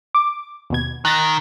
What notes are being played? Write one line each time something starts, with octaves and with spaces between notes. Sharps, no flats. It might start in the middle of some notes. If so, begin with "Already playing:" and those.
D6
D#2 B2 G#6
D#3 F#6 A6 A#6